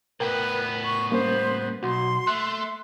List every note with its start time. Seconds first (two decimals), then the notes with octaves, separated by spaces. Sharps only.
0.20 A2 B3 A#4 B4 G5
0.85 C#6
1.11 G3 A#3 C#4 C5
1.83 B1 F#4 C6
2.27 A3 F#6